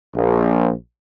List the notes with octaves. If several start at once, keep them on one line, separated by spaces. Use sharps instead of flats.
A#1